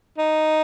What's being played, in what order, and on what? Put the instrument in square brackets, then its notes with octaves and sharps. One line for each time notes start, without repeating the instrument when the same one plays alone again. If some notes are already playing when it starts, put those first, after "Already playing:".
[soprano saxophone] D#4